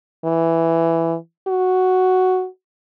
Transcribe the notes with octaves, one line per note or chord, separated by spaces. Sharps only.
E3
F#4